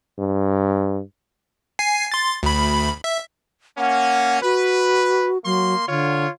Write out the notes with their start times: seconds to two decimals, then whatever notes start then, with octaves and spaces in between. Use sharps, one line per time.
0.19 G2
1.79 G#5 C7
2.12 C6 A6
2.43 D2 B5
3.04 E5
3.78 A#3 C#4 F#5
4.43 F#4 B4
5.45 F#3 A#3 C6
5.88 D3 F4 C#5